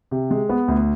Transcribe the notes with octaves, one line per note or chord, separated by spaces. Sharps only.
C3
G#3
B3
D2